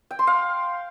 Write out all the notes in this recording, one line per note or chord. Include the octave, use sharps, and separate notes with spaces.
G5
C6
F5